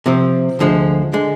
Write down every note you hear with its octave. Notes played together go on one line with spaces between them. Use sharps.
C3 F3 C4
D2 D3 F3 G#3
D3 G#3